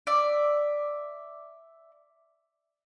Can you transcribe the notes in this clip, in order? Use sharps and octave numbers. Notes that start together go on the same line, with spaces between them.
D5 E5